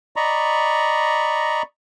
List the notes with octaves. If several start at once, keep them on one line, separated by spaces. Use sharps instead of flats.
D5 D#5 A#5 B5 C#6